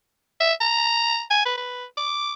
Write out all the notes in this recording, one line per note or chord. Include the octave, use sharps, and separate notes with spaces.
E5
A#5
G#5
B4
B4
D6